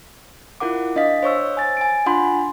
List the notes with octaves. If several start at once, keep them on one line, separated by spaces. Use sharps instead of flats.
E4 F4 A#4 F#5 D6
D4 D#5 F5 B6
C5 C#5 C#6 E6
G#5 A6
G#5 D7
D4 F4 F#5 G#5 B5 C6